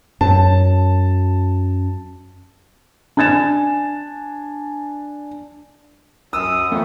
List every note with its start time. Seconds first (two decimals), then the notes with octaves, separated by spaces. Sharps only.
0.21 F#2 A5
3.17 D4 G#5 G#6 A6 E7
6.33 F#2 D#6 E6
6.72 F2 A3